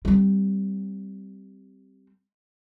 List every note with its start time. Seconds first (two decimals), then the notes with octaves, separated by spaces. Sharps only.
0.05 G3 C4